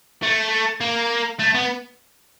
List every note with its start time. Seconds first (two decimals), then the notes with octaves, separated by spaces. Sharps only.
0.22 A3
0.80 A#3
1.39 A3
1.54 B3